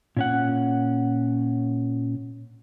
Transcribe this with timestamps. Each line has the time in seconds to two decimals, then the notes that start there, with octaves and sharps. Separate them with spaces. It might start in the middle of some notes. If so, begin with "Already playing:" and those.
0.16 A#2 C#4 F#5